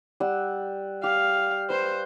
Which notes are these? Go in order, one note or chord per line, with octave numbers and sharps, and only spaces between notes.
G3 F#5 E6
G4 F5
B4 C5